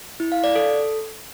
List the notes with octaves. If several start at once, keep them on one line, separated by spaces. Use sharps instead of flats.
E4
F5
D5
A4